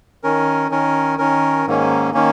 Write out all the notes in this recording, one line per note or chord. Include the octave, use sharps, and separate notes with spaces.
D#3 C#4 A#4
D#3 C#4 A#4
D#3 C#4 A#4
G#2 D#3 A#3 C#4
D#3 A#3 C#4